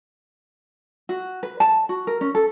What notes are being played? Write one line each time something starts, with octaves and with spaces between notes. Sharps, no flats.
F#4
B4
A5
F#4
A#4
C#4
A4